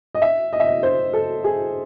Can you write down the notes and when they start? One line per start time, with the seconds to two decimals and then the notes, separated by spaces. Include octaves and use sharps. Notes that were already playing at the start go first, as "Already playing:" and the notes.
0.15 D#5
0.22 E5
0.53 D#5
0.60 E5
0.67 D#5
0.83 C5
1.13 A4
1.44 G#4